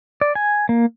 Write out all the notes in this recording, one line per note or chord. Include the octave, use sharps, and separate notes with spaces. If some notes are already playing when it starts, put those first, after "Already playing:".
D5
G#5
A#3